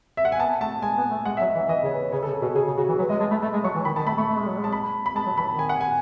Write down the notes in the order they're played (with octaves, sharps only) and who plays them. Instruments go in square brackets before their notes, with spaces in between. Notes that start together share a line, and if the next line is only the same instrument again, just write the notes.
[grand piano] E5
F#5
G#5
[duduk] B3 [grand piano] A5
[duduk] A3 [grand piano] A5
[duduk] G#3 [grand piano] G#5
[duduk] B3
A3
[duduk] G#3 [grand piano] F#5
[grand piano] E5
[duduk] F#3
[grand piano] D#5
[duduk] E3
[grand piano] D#5
[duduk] E3 [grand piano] D#5
[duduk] C#3 [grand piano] C#5
[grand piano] B4
[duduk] C#3 [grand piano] C#5
[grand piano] A4
[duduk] C#3
[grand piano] G#4
[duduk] B2
[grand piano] F#4
[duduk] C#3 [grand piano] G#4
[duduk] C#3 [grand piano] G#4
[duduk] C#3 [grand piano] F#4
[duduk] E3
[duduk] F#3 [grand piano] B4
[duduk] G#3 [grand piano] D#5
[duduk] G#3 [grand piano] A5
[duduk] A3 [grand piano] B5
[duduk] A3 [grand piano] A5
[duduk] G#3
[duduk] F#3 [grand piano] C#6
[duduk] E3
[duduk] D#3 [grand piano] B5
[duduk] D#3 [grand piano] A5
[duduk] A3 [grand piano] B5
[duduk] A3 [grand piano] C#6
[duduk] A3
G#3
F#3
G#3
[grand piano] A5
B5
B5
[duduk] G#3 [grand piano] A5
[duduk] F#3
[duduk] E3 [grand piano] B5
[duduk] D#3
[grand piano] G#5
F#5
G#5